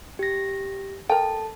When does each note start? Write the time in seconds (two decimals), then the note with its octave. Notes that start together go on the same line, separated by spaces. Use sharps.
0.19 G4 A#6
1.09 A4 A#4 G5 A5